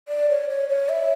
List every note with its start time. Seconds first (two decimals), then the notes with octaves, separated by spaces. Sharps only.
0.08 D5
0.29 C#5
0.49 C#5
0.69 C#5
0.89 E5